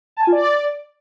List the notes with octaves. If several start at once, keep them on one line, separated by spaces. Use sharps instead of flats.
A5
G#5
F4
D5